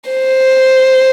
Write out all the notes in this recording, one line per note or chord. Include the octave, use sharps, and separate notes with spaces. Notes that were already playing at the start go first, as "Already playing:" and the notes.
C5